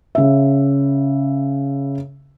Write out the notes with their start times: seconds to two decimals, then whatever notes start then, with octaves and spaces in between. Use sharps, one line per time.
0.15 C#3 E5